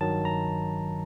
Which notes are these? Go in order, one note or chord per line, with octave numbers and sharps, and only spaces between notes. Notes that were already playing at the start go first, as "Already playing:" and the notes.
G2 D#3 F#3 A5
A#5